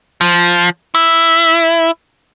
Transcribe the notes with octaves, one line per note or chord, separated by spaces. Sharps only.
F3
E4